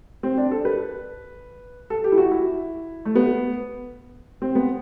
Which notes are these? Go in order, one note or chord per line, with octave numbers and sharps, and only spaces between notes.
C4
D4
A4
B4
A4
G4
E4
F#4
E4
A3
B3
C4
B3